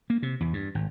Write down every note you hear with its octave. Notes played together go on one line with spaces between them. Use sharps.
A#3
C3
E2
G2
G#1